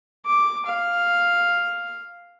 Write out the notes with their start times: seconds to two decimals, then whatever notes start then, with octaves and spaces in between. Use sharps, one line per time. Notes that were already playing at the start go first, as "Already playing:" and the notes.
0.26 D6
0.66 F5